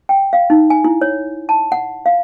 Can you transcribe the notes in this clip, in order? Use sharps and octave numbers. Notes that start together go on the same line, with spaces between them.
G5
F5
D#4
G#5
E4
C#5
A5
F#5
F5